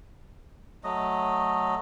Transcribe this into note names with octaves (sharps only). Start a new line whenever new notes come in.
F#3 A3 D#5